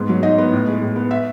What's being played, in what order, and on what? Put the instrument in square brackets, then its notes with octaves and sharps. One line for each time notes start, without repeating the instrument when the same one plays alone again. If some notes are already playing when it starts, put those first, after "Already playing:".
Already playing: [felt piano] G#2 B3
F#3
D#4 D#5
B3
A2
G#3
A2
B3
E5